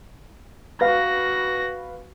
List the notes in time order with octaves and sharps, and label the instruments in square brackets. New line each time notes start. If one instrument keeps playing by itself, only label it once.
[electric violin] F#4 A#6 [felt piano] B4 F5